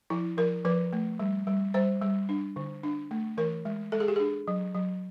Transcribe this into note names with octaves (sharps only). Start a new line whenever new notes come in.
F3 E4
F3 A#4
F3 B4
A3
G3
G3
G3 C5
G3
D4
D3
D4
A3
E3 A#4
G#3
G#3 A4
G#4
G4
D4 G#4
F#3
F#3